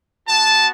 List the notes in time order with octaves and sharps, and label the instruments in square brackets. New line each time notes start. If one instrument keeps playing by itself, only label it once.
[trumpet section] B3 F#4 A5